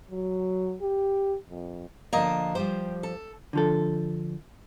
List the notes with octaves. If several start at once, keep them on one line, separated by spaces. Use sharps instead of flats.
F#3
G4
F2
D3 F3 A#3 D5 D#5
F3 G3 G4 C5
A4
D3 F3 A4